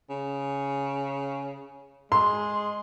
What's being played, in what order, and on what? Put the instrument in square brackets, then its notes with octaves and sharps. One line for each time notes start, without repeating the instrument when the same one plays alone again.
[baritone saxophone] C#3
[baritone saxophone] G#3 [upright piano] C6